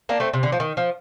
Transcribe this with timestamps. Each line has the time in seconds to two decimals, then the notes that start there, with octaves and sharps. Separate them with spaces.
0.09 A#3 D4
0.20 A3 C4
0.33 C3
0.43 D3
0.52 F3
0.60 D#3
0.77 F3